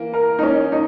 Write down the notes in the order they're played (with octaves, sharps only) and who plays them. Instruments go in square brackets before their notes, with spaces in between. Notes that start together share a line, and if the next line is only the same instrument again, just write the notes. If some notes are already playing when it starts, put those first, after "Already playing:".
Already playing: [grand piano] E3 A#3
[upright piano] A#4
D#4
C#4
D#4